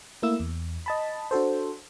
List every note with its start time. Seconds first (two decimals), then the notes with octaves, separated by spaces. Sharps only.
0.22 A3 A#3 E4 E6
0.40 E2
0.86 D#5 A5 B5
1.31 D4 F#4 A4 C5